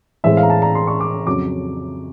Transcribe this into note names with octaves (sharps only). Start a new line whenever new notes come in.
A2 E3 G#3 C4 E5
F5
A#5
A5
A#5
C6
C#6
D6
F2 C#3 F#3 D6